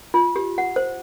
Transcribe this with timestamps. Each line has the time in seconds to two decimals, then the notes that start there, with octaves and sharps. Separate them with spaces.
0.14 F4
0.36 G4
0.58 F#5
0.76 C5